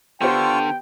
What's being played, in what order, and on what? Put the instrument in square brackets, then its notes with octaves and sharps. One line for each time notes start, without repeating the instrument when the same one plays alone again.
[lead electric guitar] D3 [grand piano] B3 G4 C5 [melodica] F4 C#6 [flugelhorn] G5